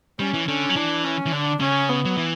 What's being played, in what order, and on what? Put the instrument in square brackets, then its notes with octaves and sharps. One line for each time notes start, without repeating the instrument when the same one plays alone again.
[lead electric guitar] G3 [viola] C#4
[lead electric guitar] E3
[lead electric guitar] D3 [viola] C#4
[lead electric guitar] F#3
[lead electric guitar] E3 [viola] D4
[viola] C#4
[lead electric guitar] E3
[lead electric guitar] D3 [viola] D4
[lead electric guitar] C#3 [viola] C#4
[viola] B3
[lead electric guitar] F#3
E3